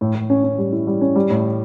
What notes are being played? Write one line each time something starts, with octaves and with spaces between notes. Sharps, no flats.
A2
A2
C#4
C#4
G3
E4
G3
C#4
G3
A2